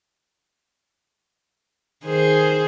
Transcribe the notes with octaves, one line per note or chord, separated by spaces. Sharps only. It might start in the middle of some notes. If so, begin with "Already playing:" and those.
D#3 G#4 C5